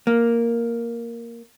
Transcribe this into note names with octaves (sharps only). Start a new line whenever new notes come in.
A#3